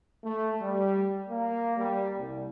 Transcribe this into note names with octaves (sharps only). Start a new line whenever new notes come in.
A3
G3
A#3
G3
C2